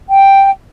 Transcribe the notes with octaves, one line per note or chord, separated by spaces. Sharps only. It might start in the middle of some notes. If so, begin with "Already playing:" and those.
G5